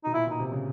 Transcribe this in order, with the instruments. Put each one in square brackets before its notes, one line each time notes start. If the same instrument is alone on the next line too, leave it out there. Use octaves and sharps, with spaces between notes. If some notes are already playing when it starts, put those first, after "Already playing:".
[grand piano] B2 [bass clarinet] D#4
[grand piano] A#2 [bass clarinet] E4
[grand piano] B2 [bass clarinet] D#4
[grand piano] C3
C#3